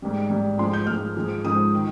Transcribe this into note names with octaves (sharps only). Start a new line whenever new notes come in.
G#2 G3
G#2 G3
G#2 F3 G#3 C6
G6
G#2 F3 G#3 F6
G#2 F3 G#3
G#2 F3 G#3 D#6
D#3